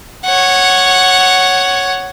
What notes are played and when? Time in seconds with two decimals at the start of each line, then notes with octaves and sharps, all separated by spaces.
0.25 C#5 F#5